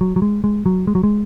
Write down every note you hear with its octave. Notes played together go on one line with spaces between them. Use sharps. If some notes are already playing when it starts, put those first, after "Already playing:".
F#3
F#3
G#3
G#3
F#3
G#3
F#3
G#3